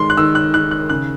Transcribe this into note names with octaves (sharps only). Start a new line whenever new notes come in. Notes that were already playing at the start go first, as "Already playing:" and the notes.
Already playing: D#3 G#3 C6
F#6
D#3 E6
F#6
D#3 F#6
F#6
C#3 F#6